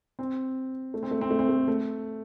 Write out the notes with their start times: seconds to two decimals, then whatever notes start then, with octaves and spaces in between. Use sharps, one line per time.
0.19 C4
0.94 A3
1.03 C4
1.11 A3
1.21 C4
1.31 A3
1.39 C4
1.49 A3
1.68 A3